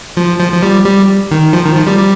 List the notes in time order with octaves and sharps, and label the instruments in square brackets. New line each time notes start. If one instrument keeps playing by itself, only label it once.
[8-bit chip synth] F3
F3
F3
G3
G3
D#3
F3
D#3
F3
G3
G3